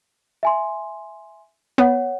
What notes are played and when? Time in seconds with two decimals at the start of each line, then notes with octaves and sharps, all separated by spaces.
0.43 E5 G#5 C6
1.78 B3 C#5 F#5